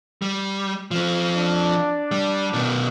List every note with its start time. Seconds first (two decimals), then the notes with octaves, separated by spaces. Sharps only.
0.22 G3
0.91 F3 C4
1.34 D4
2.11 G3
2.53 B2 D#3